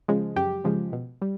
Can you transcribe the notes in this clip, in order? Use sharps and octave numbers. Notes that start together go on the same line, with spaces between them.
C#3 F3 G#3
F#2 G4
C#3 F3 G#3
B2
G3